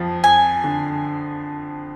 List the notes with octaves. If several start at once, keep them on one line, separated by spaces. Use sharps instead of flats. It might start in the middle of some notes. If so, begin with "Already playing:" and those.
Already playing: F2 F3
F2 G#5
D3